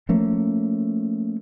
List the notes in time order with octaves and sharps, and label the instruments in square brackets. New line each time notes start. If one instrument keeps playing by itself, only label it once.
[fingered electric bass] F3 A3 A#3 C#4